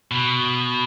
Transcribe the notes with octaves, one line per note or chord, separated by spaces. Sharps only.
B2